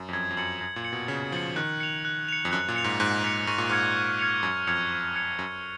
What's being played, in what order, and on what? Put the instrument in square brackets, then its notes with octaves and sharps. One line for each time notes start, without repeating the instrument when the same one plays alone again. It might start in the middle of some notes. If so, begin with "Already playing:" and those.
Already playing: [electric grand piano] F#2
F2
[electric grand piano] F#2 [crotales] G#6
[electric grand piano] F2
[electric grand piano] F#2 [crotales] C#7 F#7
[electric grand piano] F#2 [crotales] G#6
[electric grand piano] A#2
[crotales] C#7 F#7
[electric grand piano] B2
[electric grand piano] C#3 [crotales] G#6
[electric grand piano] F3 [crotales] C#7 F#7
[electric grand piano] D#3 [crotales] F#6
[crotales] C#7 F7
F#6
C#7 F7
[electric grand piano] F2
[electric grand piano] F#2 [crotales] F#6
[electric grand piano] A#2
[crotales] C#7 F7
[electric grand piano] G#2
[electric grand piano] G#2 [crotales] F#6
[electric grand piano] G#2 [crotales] F7
[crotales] C#7
[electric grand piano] G#2 [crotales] C#6
[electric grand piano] A#2
[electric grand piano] G#2 [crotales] F6 G#6 C#7 F7
[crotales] C#6
F6 G#6 C#7 F7
[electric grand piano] F#2 [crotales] C#6
[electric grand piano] F2 [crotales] F6 G#6 C#7 F7
[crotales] C#6
F6 G#6 C#7 F7
[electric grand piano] F#2 [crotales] C#6